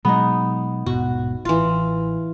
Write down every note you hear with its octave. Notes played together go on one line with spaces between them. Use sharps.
B2 F#3 G#3 B3 D#4
D#1 G#2 B2 F#4
A1 E3 F4